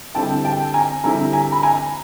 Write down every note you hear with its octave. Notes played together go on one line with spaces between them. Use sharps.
D3 G3 C4 E4 G5 A5
G5 A5
G#5 A#5
D3 G3 C4 E4 G#5 A#5
G#5 A#5
B5
G#5 A#5